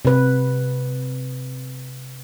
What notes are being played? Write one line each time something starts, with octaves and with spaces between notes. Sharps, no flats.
C3 B4